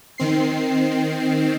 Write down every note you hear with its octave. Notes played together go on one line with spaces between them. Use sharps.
D#3 C4 C7